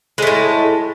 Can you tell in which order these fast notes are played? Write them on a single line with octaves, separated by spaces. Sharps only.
G#3 A3 A2